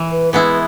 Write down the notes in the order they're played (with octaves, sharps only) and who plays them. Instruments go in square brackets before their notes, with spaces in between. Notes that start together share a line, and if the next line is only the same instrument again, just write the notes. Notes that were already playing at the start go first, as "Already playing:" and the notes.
Already playing: [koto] E3
[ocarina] B4
[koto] G#3 B3 E4 [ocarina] B4